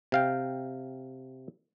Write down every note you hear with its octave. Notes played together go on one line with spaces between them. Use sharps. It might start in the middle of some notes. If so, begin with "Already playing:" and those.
C3 F5 G5